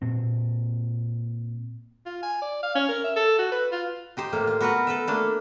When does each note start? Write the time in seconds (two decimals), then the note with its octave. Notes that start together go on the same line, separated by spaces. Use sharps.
0.02 A#2 C4
2.06 F4
2.23 G#5
2.42 D5
2.63 F5
2.75 C#4
2.89 A#4
3.04 E5
3.16 A4
3.38 F#4
3.52 B4
3.72 F4
4.17 D#4 G4 C5
4.33 A2 A#3
4.47 F4
4.61 B3 F#4 A#4 B4 F#5
4.87 A4 B4 E5
5.07 A3 A#3 D4